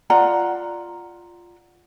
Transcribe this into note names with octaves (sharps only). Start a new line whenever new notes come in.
F4 D5 F#5 A#5